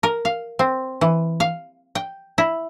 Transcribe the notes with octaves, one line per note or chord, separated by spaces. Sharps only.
A#4
F5
C4
E3
F5
G5
E4